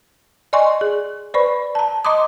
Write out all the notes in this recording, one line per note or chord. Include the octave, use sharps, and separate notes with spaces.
D5 D#5 G#5 C6 C#6
G#4
B4 C5 D5 B5 C#6
A5 A#5
D#5 A#5 C6 D6 D#6